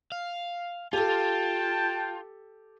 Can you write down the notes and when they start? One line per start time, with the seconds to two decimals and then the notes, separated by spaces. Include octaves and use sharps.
0.12 F5
0.93 F4 G4 A4 G5 A5